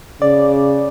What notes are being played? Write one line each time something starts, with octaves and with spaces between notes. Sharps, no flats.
C#3 D5